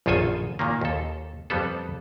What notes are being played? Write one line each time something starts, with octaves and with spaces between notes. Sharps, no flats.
A#1 F#2 D#3 F4 A4 G#5
A#2 D#3 A#3
D#2 A4
F2 G3 B3 A4